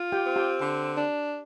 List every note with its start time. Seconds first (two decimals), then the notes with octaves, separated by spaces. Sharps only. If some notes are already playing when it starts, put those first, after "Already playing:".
Already playing: F4
0.12 G4 G5
0.24 C4
0.36 G4 G5
0.60 D3
0.95 D4